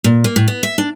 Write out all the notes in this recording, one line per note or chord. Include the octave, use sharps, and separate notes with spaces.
A#2
A#3
A2
B3
E5
D4